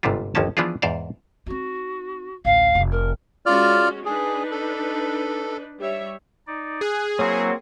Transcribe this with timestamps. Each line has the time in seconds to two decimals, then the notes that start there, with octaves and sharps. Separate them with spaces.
0.03 G1 G#2 C3 G3 E4 F4
0.35 G1 D#2 F3 A#3 C#4 A5
0.57 E3 F3 B3 D4 F4 G#4
0.82 E2 G#2 C5 D5 F5
1.46 C4 D#4 F#4
2.45 A1 D2 F5
2.75 F1
2.91 A#4
3.46 G#3 C#4 F4 F#4 D5 F6
4.05 D4 D#4 G#4 B4
4.51 A4
5.80 G3 C#5 E5
6.47 D#4 D5
6.81 G#4 F#6
7.19 F#3 A#3 C4 E4 F#4 C#5 C6